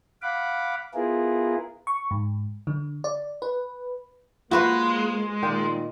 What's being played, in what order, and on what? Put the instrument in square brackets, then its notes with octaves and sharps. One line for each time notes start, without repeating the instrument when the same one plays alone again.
[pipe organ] F5 F#5 B5 D6
B3 E4 F4 G#4 A#4
[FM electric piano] C#6
G#2
D3
D5
B4
[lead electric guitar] G#3 [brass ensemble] A#3 [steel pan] F4 F#5 [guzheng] F#4 B4 C5
[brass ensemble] A#2 D#3 [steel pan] A#4 D5 G5